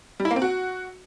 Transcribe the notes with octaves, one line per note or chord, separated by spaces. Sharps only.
G3
E4
A#3
C4
F#4